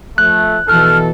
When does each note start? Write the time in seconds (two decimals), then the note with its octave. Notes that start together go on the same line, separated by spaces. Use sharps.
0.18 F3 A3 F#6
0.68 B2 E3 A4 F6